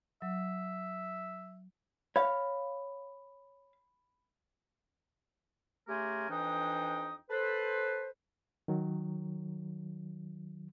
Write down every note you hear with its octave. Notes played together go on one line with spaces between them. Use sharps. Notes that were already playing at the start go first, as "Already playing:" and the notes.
F#3 E5
C#5 F5 B5
C#3 A3 G4 A#4 G#5 C6
F2 E3 D4 D#4 G5 D#6
A4 B4 C5
D#3 F#3